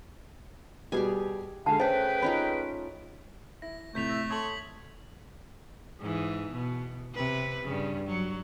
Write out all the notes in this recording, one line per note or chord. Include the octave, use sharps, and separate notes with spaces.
B2 G3 G4 G#4 G#5
D3 G#3 C#4 A4 F5 A5
A3 C#4 G#4 B4 C5 G5 A5
C#4 D#4 F4 B5
E4 A#6
F2 A2 C3 A3 G6 B6 F7
E5 A#6
A4 C#5 C6 D#6 F#7
G#2 E3
B2
C3 B4
G2 C#3
F#3